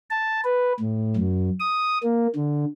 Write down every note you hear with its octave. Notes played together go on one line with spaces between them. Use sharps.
A5
B4
A2
F#2
D#6
A#3
D3